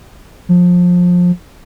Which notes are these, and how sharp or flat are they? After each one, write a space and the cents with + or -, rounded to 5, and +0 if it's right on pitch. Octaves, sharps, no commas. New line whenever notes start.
F3 +25